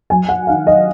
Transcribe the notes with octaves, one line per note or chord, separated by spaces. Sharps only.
F#3 G#5
F#5
D#3 F5
D#5